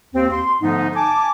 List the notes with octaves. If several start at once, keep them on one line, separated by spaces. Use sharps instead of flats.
D#2 C4
C6
G#2 D3 F3 A3 B3 D#4
G#5 A5 D6